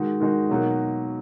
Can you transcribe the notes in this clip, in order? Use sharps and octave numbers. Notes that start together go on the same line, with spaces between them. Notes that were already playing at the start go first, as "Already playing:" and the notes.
Already playing: D#3 G#3 D#4 F#4
D#3 G#3 D#4 F#4
B2 F#3 A#3 D#4 F#4